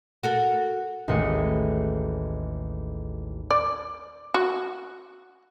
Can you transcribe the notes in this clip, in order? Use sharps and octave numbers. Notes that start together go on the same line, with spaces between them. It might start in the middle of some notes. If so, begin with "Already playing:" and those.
F#4 A4 A#4
A1 D#2 G#3 A3 D#5 C#7
D5
F#4